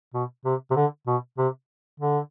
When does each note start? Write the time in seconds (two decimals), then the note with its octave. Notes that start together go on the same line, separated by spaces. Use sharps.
0.14 B2
0.45 C3
0.71 C3
0.76 D3
1.07 B2
1.38 C3
2.00 D3